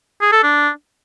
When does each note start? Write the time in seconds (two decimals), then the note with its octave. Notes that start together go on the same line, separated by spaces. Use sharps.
0.22 G#4
0.32 A4
0.43 D4